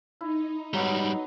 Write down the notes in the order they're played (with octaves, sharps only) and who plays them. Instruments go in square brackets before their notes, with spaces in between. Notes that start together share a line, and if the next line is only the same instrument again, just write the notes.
[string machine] D#4 [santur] E4
[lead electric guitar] G#2 G3 [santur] F#3 B3